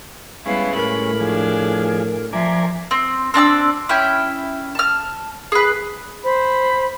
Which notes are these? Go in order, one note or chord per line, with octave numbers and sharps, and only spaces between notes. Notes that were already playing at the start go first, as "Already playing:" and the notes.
G3 G#3 B3 C#4 E4 F5
A2 A#4 B5
F3 D4 G#4
F3 A#4 D5 E5 G#5
C4
C4 D4 A5 E6
C#4 E4 G5
A5 F6
G#4 B4
C5 B5